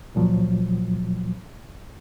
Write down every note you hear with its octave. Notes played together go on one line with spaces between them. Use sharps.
C#2 A#2 F3 F#3